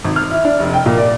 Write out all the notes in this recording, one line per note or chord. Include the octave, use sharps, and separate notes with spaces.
G#1
F6
E4
D4
F1
G5
A#2
D5